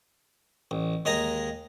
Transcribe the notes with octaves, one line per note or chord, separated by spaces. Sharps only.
A1
D#2 G#3 D#5 A#5